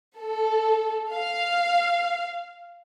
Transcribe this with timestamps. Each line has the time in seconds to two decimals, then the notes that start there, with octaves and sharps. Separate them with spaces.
0.18 A4
1.14 F5